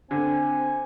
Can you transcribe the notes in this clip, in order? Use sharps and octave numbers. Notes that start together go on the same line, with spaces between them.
D3 C4 G#5